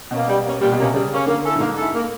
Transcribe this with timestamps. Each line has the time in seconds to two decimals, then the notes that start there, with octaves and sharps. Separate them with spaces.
0.10 B2 A#3 C#4
0.27 G3
0.44 A#3 C#4
0.61 A#2 G3
0.72 B2
0.77 C3 A#3 C#4
0.94 C#3 G3
1.10 A#3 C#4
1.26 D3 A#3
1.44 C#4 E4 A4
1.55 G2
1.60 G#2 A#3
1.77 C#4 E4 A4
1.94 A#3